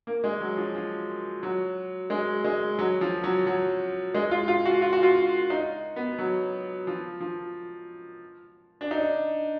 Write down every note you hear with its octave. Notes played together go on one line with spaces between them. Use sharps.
A#3
G#3
F#3
F3
F3
F#3
G#3
G#3
F#3
F3
F#3
F#3
G#3
F4
F4
F#4
F4
F#4
F4
D#4
B3
F#3
F3
F3
D4
D#4